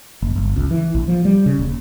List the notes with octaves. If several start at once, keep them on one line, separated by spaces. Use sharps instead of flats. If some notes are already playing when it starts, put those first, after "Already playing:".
F#1
G1
C#2
E3
A#1
F3
G3
C#3
D#1